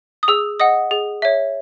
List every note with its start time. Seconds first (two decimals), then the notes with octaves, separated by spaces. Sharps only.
0.23 D#6
0.28 G#4 E6
0.60 D#5 F#5 D#6
0.91 G#4
1.22 C#5 E5